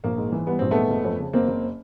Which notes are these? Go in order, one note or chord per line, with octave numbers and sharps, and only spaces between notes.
A#1 A#3
G#2
E3
G3 B3
A#1 C4
G#2 A3 B3
F#1
F2
C#3
F#1 A#3 C4
F#1